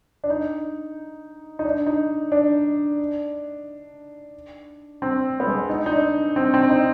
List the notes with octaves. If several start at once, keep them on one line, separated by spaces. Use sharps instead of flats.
D4
D#4
D#4
D4
D#4
D4
C4
B3
G#3
D#4
D#4
D4
C4
C4
D#4